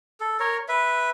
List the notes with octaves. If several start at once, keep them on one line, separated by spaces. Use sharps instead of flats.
A4
A#4 C#5
B4 E5